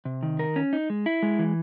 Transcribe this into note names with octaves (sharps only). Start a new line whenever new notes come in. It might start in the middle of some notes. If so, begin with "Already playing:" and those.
C3
D#3
A#4
C#4
D#4
G#3
E4
G#3
E3